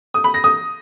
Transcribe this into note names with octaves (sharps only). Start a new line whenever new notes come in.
D#6
B5
A#6
D#6